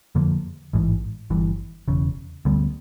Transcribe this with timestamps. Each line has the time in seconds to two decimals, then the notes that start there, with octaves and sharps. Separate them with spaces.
0.15 F2 D3 F3 A#3
0.73 A1 G#2 E3
1.30 G1 G2 E3
1.88 E1 E2 C#3
2.45 D2 D3 G3 B3